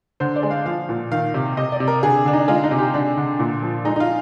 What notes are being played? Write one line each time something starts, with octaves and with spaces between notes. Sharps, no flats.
D3 C5
D5
G#3
F5
F3 F5
A#2
D#3 F5
C3
C3 D#5
D5
C3
A#4
D3 G#4
D3 D4
D#4
G#3 F4
D#4
C3
G4
D3 D4
D3
A#2
F3
G#3 D#4
D#4
F4